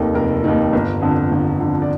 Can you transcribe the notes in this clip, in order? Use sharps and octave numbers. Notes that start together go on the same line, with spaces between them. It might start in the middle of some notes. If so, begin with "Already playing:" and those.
Already playing: F1 D#2 D#3 A4
F1 A#4
D#2 D#3
G1
F2 D3
G1
F2 D3
D5